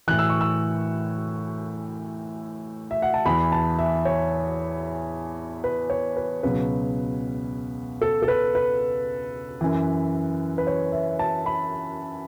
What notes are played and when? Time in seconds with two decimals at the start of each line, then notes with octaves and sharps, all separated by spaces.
0.08 A2 E3 F#6
0.19 E6
0.29 C#6
0.41 E6
2.91 E5
3.02 F#5
3.14 A5
3.25 E2 E3 B5
3.52 A5
3.79 E5
4.05 C#5
5.64 B4
5.90 C#5
6.17 B4
6.43 C#2 B2 F#3 B4
8.02 A4
8.23 A4
8.28 B4
8.55 B4
9.61 F#2 E3
10.58 B4
10.67 C#5
10.92 E5
11.19 A5
11.46 B5